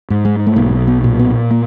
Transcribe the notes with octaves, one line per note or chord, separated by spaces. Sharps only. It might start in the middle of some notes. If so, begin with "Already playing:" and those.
G#2
G#3
A3
B1 A#3
B3
A#2
B3
A#3